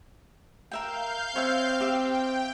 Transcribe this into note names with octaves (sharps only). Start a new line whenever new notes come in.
A#4 E5 F5 G5 G6
C4 C#5 E5
G4 E5 G5